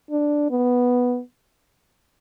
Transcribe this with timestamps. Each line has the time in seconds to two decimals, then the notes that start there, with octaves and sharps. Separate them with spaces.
0.11 D4
0.50 B3